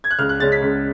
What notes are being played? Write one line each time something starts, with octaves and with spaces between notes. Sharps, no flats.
G#6
F#6
C#2 F6
F#6
C#3 G#3 C#4 A6
B6
C#2